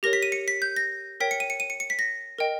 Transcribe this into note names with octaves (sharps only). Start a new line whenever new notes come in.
G4 A#4 C#5 A#6
B6
D#7
C#7
B6
G6
A#6
A#4 C#5 G5 B6
C#7
D#7
C#7
D#7
C#7
C#7
B6
A#6
A#4 D#5 G5